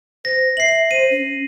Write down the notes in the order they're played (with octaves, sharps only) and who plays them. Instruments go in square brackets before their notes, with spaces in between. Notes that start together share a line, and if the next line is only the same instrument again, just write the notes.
[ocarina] C5 [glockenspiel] A#6
[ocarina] E5 [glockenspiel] C7 F#7
[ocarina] C5 [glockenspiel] D#7
[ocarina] C#4